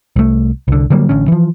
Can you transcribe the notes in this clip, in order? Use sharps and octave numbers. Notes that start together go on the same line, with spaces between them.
C2 A3
C2 D3
D3 F#3 G3 A#3
A1 D3 C#4
E3 F3